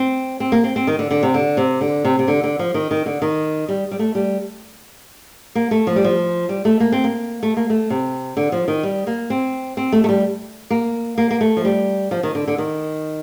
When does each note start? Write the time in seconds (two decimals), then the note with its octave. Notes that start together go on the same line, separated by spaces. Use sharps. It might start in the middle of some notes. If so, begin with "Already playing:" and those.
Already playing: C4
0.40 C4
0.52 A#3
0.64 C4
0.76 C4
0.87 D#3
0.99 D3
1.11 D3
1.23 C3
1.34 D3
1.57 C3
1.81 D3
2.05 C3
2.19 C3
2.28 D3
2.44 D3
2.59 F3
2.74 D#3
2.91 D#3
3.06 D3
3.22 D#3
3.69 G3
3.91 G3
3.99 A3
4.15 G3
5.55 A#3
5.71 A3
5.87 F3
5.96 G3
6.04 F3
6.49 G3
6.65 A3
6.80 A#3
6.92 C4
7.04 A#3
7.43 A3
7.57 A#3
7.70 A3
7.90 C3
8.37 D3
8.52 F3
8.68 D#3
8.83 G3
9.07 A#3
9.30 C4
9.77 C4
9.92 A3
10.04 A3
10.09 G3
10.70 A#3
11.18 A#3
11.30 A#3
11.41 A3
11.57 F3
11.65 G3
12.11 F3
12.23 D#3
12.35 D3
12.47 D3
12.58 D#3